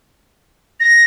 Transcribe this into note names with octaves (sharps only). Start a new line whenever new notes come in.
A#6